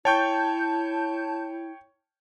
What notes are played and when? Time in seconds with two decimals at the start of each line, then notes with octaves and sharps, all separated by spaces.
0.05 E4 C#5 G5 A5 C#6 G6